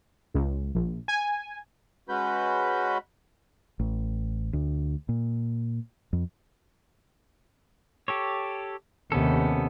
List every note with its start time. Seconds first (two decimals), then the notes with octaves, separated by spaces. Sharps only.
0.34 C#2
0.75 A#1
1.08 G#5
2.09 G#3 C#4 F#4 B4 B5 G6
3.79 A1
4.53 D2
5.09 A#2
6.13 F2
8.08 G4 A4 C#5
9.12 D#2 C3 B3 C#4 A4